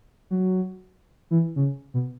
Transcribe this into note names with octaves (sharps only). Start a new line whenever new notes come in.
F#3
E3
C#3
B2